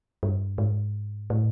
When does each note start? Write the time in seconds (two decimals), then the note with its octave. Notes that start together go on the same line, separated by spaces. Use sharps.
0.23 G2
0.58 G#2
1.30 A2